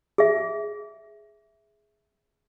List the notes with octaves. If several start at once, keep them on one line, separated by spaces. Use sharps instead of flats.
G#4 E5